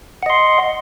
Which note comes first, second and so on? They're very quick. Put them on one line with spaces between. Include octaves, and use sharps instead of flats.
F#5 D#5 C6